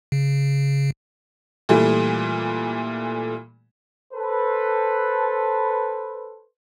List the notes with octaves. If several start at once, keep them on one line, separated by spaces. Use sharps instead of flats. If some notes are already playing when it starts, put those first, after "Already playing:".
C#3
A#2 E3 G3 A3
A4 B4 C5